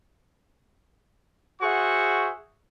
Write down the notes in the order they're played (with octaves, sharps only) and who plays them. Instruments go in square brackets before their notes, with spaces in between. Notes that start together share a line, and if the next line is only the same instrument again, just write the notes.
[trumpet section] F#4 G#4 C5 E5 F#5 C#6